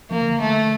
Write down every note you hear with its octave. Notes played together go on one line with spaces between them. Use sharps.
F3 A#3
D3
A3